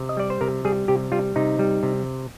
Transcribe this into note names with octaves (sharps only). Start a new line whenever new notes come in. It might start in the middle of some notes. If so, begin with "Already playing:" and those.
Already playing: C3
D#5
G3 D5
C5
C3 A#4
G3 G#4
C3 G4
G3 F4
C3 D#4
G3
C3